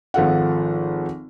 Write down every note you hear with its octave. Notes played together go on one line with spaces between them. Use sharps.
G#1 F3 F4 A4 F5 F#5